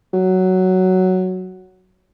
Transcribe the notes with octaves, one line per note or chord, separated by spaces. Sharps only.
F#3